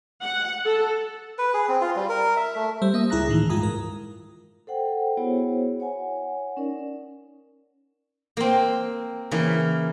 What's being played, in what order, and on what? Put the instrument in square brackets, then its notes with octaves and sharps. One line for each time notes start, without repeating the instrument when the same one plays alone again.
[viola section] F#5
A4
[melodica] B4
G#4
C4
F4
G3
A#4
E5
A3
[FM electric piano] G3 C5 E6
A#3 E5 D#6
C#2 E4 G#4 A#5 F#6 A#6
A2 D#3 E3
G2 G#3 F4 A#5 D#6
A#4
[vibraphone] A4 C5 F#5 G5
B3 E4 F#4 G#4 C5 C#5
C#5 F#5 G#5
C#4 D#4 A#4 D5
[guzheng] A#3 C4
C#3 E3 A#3